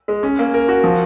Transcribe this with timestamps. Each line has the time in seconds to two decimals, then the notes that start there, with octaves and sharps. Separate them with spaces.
0.08 G#3
0.23 C#4
0.39 A#3
0.54 A#4
0.68 F#4
0.84 F3